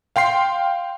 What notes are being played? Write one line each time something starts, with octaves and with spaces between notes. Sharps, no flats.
F5 G5 C6 C7